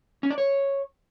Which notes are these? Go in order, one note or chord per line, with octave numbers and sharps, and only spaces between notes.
C#4
D5
C#5